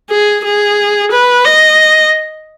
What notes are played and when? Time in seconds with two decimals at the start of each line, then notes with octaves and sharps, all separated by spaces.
0.10 G#4
0.44 G#4
1.12 B4
1.45 D#5